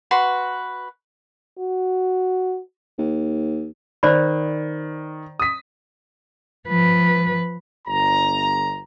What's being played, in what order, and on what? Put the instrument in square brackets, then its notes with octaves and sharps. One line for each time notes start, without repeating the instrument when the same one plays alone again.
[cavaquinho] F#4 B4 C6
[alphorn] F#4
[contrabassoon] D#2
[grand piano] D#3 [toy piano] C5 D5 B5
[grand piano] D#6 B6
[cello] F3 B4
[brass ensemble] G1 A#5